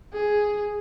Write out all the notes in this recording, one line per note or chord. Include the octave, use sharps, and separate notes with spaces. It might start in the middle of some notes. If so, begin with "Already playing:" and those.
G#4